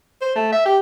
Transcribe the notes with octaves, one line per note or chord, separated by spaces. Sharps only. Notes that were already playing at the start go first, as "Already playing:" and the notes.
C5
A3
E5
G4